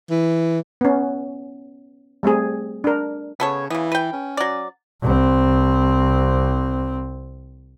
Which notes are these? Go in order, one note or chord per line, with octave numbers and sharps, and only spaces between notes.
E3
B3 C#4
G3 A3 C4 G#4
D4 A#4
C#3 B3 A4 C#5
C#3 E3 B3
B4 G5
C#4
F#3 D5
C2 C4